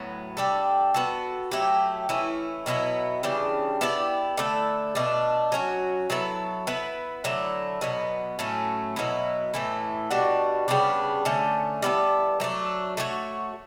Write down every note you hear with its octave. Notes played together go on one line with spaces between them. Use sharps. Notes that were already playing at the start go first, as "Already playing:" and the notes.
Already playing: A2 F#3 B3
G3 D4 A4
B3 F#4 A4
F#3 A3 E4 G4
E3 A3 C#4 E4
B2 F#3 B3 E4
C#3 E3 G3 D4
B3 E4 G4 D5
D3 A3 E4 A4
B2 A3 D4
F#3 C#4 F#4
F#3 B3 E4 A4
B3 E4 B4
D3 F#3 A3 E4
B2 F#3 B3
A2 F#3 A3 C#4
B2 F#3 B3 E4
A2 E3 A3 E4
B2 G3 D4 F#4
C#3 G3 B3 D4
D3 A3 C#4
G3 B3 E4 A4
F#3 A3 D4
A3 D4 F#4 C#5